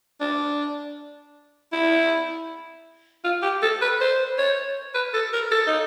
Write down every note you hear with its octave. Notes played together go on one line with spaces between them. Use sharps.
D4
E4
F4
G4
A4
B4
C5
C#5
B4
A4
A#4
A4
D#4